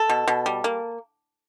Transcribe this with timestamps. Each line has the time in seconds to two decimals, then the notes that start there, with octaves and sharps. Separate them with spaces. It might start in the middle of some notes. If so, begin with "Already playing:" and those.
Already playing: A4
0.09 B2
0.28 B2
0.46 G3
0.64 A#3